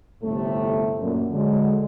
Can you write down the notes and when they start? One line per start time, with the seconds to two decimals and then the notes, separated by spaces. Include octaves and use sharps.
0.22 G1 A2 C3 A3
1.01 F#2 A#2
1.32 D3 F#3 G#3